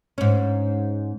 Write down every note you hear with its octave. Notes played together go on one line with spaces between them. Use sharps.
G#2 C#4